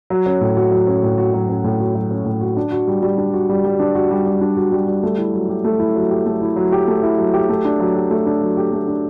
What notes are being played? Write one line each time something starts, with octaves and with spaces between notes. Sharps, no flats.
F#3
C#4
A2
F#4
F#3
C#4
A2
F#4
F#3
C#4
A2
F#4
F#3
C#4
A2
F#4
D4
F#4
G3
G3
D4
F#4
G3
G3
D4
F#4
G3
G3
D4
F#4
G3
G3
A3
E4
F#3
G4
A3
E4
F#3
G4
A3
E4
F#3
G4
A3
E4
F#3
G4
A3
D4
F#3
G4
A3
D4
F#3
G4
A3
D4